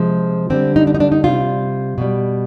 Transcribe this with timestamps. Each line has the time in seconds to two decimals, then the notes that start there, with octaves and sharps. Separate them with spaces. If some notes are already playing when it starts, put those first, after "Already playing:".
Already playing: C3 F3 G#3
0.50 D3 G3 C4
0.76 D#4
0.87 D4
0.95 D#4
1.00 D4
1.12 D#4
1.24 C3 G3 F4
1.98 B2 G3